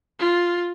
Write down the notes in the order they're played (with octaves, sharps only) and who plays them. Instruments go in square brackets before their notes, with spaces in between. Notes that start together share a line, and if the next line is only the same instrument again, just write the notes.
[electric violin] F4